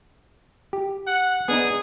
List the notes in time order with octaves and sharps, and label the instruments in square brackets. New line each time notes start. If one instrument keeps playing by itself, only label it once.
[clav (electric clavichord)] G4
[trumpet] F#5
[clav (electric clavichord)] B3 D4 D#4 [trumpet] G#4